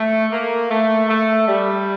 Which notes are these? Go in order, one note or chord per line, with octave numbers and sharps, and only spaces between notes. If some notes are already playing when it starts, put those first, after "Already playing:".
Already playing: A3
A#3
A3
A3
G3